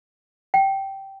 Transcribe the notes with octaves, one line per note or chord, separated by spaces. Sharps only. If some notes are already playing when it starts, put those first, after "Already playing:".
G5